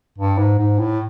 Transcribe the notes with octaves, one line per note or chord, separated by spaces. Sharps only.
G2
G#2
G#2
A2